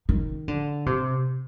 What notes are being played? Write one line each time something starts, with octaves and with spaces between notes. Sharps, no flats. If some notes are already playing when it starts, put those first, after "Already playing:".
D#3
D3
C3